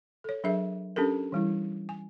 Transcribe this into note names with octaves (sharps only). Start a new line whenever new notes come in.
A4 C#5
F#3 D4 G#4 A#4 E5
C#4 D4 G4 A4 A#4
E3 G3 E4
G#5